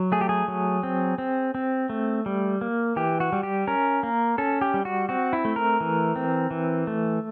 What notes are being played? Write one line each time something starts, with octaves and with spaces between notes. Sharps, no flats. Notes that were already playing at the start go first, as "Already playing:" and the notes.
Already playing: F#3
A3 G#4
G4
G#4
F#3
C4
C4
C4
A3
G3
A#3
E3 G4
F#4
G3
G4
C#4 A#4
A#3
C#4 A4
G4
G3
F#4
C4 F#4
E4
A3
A#4
E3
C4
E3
A3